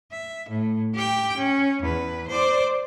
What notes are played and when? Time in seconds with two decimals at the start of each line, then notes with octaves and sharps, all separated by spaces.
0.11 E5
0.49 A2
0.94 G4 G5
1.37 C#4
1.82 E2 B4
2.28 C5 D5